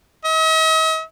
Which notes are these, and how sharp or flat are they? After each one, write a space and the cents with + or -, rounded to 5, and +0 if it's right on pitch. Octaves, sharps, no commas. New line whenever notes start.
D#5 +45